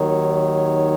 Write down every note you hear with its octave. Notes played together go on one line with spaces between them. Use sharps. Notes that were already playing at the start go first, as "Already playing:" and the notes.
Already playing: D#2 D#3 F#3 C#5
C#5